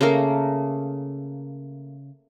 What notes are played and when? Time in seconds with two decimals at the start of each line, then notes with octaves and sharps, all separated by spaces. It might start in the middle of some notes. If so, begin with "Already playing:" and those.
0.01 C#3 A3 A#3 A#4